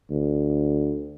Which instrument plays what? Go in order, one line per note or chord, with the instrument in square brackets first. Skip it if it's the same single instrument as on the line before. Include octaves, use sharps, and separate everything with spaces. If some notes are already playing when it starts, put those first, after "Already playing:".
[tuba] D2